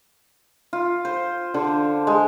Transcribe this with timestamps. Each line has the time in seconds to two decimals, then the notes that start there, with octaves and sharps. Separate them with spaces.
0.73 F4
1.05 C5
1.54 D3
2.07 G#3